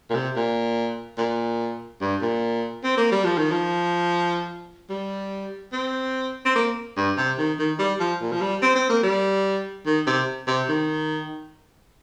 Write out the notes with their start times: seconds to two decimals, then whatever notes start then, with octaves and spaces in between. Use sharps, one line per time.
0.10 A#2
0.15 C3
0.36 A#2
1.18 A#2
2.01 G2
2.21 A#2
2.84 C4
2.97 A#3
3.12 G3
3.25 F3
3.38 D#3
3.52 F3
4.90 G3
5.73 C4
6.45 C4
6.55 A#3
6.97 G2
7.17 C3
7.38 D#3
7.59 D#3
7.79 G3
8.00 F3
8.21 A#2
8.32 F3
8.41 G3
8.62 C4
8.76 C4
8.90 A#3
9.03 G3
9.86 D#3
10.07 C3
10.47 C3
10.69 D#3